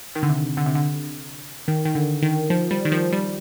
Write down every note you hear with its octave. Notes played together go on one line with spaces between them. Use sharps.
D#3
D3
C3
D3
C3
D3
D#3
D#3
D3
D#3
F3
G3
D#3
F3
G3